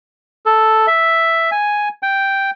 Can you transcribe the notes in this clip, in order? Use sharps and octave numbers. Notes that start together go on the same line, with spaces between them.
A4
E5
G#5
G5